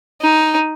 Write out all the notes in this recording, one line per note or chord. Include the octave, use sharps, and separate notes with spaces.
D#4